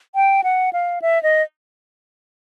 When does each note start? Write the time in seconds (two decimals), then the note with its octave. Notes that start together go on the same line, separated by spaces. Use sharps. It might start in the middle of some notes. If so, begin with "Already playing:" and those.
0.15 G5
0.44 F#5
0.73 F5
1.02 E5
1.23 D#5